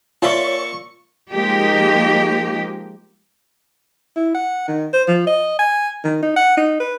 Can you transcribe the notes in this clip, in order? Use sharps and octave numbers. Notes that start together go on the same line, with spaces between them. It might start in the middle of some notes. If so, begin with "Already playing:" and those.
A#3 F4 C#5 D5 E5 A5 C#6
F3 G#3 A#3 D#4 G4
E4
F#5
D#3
C5
F3
D#5
G#5
D#3
D#4
F#5
D#4
B4